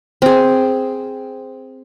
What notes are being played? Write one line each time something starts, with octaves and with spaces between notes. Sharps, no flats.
C4 G#4